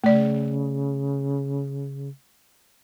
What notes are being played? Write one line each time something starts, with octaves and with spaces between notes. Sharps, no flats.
C#3 A3 D5